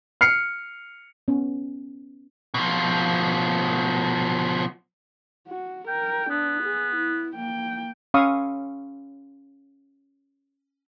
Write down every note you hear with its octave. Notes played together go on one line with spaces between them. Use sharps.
F6 C7 C#7
B3 C#4
B2 F3
F#4
A#4 G5
B3 D4
G#4
E4
A#3 G5
C#4 F5 B5 C#6 D#6 E6